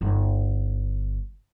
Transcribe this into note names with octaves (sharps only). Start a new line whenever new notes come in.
G1 D#4